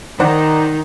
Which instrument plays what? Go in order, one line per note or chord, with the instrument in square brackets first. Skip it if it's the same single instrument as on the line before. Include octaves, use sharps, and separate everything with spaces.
[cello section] D#3 [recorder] D#4 [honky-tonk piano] C5 D5 F#5